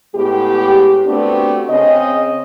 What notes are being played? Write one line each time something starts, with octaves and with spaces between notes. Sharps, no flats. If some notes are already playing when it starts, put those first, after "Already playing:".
A2 G#3 B3 G4
A3 B3 C4 D4 F#4 G4
C#3 C4 C#4 D#5